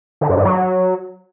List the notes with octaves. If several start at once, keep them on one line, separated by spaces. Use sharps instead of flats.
D3
F#2
G2
F#3